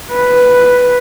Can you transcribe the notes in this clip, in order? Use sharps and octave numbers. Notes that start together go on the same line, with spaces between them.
B4